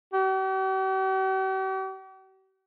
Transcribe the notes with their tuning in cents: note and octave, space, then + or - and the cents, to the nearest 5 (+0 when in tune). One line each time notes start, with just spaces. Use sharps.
G4 -45